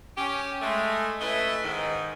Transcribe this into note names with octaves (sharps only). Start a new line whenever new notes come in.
C#4 G4
G#3 A3
A3 C#4 E4 B4 D#5 E5
G#2 D#3